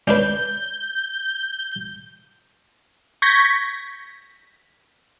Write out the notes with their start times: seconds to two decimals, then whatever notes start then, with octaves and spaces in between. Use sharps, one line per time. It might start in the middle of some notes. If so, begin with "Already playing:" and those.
0.07 C#4 D4 B4 G6
3.22 C#6 G6 G#6 A#6 B6